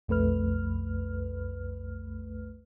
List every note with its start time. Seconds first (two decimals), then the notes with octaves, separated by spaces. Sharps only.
0.08 B1 F2 A3 B4 F6